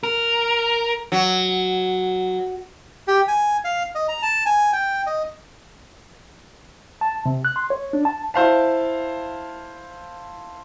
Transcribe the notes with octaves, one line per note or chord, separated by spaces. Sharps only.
A#4
F#3
G4
G#5
F5
D#5
A#5
A5
G#5
G5
D#5
A5
C3
F#6
C6
C#5
D4
A5
E4 C5 F5 A5